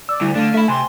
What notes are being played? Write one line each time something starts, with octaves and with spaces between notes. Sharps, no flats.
D5 E6
D2 G3 E4
D3 A3 D4 F5
A3 E5 B5
C3 G#5 C6